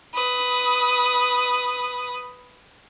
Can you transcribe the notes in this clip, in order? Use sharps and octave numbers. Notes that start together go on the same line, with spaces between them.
B4 D#6